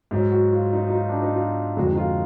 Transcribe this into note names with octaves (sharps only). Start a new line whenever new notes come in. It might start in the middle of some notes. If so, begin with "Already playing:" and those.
G#2 F#3
F#4
F4
D#4
D#4
F4
D4
D#4
F4
F2 D3 G#3 F#4
D#4
F4